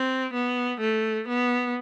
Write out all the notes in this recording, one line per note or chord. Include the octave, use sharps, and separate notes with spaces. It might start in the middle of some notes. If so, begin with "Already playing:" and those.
Already playing: C4
B3
A3
B3